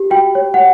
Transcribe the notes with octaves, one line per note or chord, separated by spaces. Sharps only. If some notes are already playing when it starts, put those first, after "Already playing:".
Already playing: G4
F#4 G5
C#5
F#5
C#5